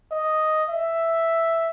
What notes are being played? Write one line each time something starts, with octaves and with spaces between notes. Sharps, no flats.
D#5
E5